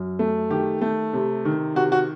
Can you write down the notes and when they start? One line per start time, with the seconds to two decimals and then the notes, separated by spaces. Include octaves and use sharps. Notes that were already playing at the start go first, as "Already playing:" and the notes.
Already playing: F#2
0.19 A3
0.51 D#3 G4
0.81 A3
1.13 C3
1.45 D#3
1.75 C3 F#4
1.92 F#4